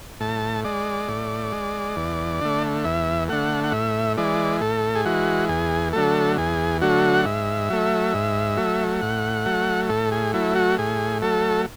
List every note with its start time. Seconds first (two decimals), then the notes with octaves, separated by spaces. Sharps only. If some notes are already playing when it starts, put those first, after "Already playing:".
0.20 A2 A5
0.64 G#3 D5
1.08 A2
1.52 G#3
1.96 E2
2.41 D3 A3
2.84 E2 E5
3.29 D3 A3 F#5
3.64 F#5
3.72 A2 E5
4.17 E3 G#3 D5
4.61 A2 A4
4.95 G#4
5.05 E3 G#3 F#4
5.49 E2 G#4
5.93 D3 F#3 A3 A4
6.38 E2 G#4
6.81 D3 F#3 A3 F#4
7.14 F#5
7.25 G#2 E5
7.70 F#3 A3
8.14 G#2
8.57 F#3 A3
9.02 A2 F#5
9.46 F#3 A3
9.90 A2 A4
10.12 G#4
10.33 F#3 A3 E4
10.55 F#4
10.78 A2 G#4
11.22 F#3 A3 A4